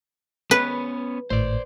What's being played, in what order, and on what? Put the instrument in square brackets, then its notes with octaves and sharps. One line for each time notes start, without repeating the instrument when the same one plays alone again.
[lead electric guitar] B3 C#4 [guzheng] B4
[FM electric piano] G#1 A2 [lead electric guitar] C5 D5